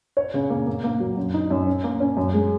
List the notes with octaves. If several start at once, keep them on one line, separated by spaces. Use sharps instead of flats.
C#5
C#3
A#3
A#3
A#3
F#3
F#2
D#4
F#2
C#4
A#3
C#4
F#2
G#3